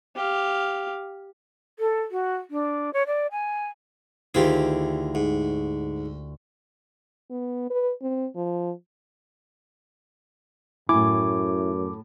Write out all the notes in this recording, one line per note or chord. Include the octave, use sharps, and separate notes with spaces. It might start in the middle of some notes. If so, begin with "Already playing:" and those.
G4 F5
A4
F#4
D4
C#5
D5
G#5
D2 D#3 E4 F4 G4 G#4
G#2
B3
B4
C4
F3
F#2 A2 E4 G#5 D6